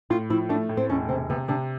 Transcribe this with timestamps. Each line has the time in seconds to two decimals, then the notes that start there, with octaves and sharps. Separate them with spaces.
0.10 A2 F4
0.30 F3 E4
0.49 A3 D4
0.69 A2
0.77 C4
0.90 E1 C#4
1.09 C3 C4
1.30 C3 B3
1.48 C3 D4